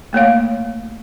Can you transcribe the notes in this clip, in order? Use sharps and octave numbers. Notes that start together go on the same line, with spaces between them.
A3 A#3 C#5 F5